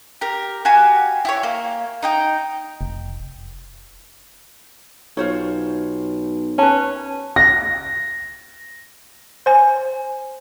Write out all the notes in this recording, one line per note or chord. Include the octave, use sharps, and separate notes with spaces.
G4 A#4
F#4 G4 F5 G#5
E4 G4 C#5
A#3
D#4 D#5 G5
F1
B1 F4 C5 C#5
C#4 B4 A5
A#6
C5 G#5